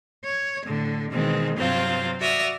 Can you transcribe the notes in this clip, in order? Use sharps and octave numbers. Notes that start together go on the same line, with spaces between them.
C#5
A2 D3
B2 D#3 E3 G#3 C4
G2 C3 F#3 C4 F4 F5
F#4 D5 E5 D#6 F6